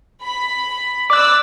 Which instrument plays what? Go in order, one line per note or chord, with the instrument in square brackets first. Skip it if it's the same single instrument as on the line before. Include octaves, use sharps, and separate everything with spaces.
[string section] B5
[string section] D5 E6 [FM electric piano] D6 F#6